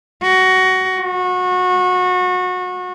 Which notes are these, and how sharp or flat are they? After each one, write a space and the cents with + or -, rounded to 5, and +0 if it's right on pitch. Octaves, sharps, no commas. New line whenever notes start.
F#4 +15
F#4 -25